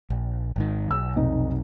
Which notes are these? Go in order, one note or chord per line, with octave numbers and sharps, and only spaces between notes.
A#1
G#1 G#2 D#3
B1 E6
F1 D#4